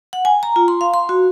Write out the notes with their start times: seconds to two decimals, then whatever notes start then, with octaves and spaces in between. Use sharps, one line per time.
0.13 F#5
0.25 G#5
0.43 A#5
0.56 F4
0.68 C6
0.81 F5
0.94 C6
1.09 F#4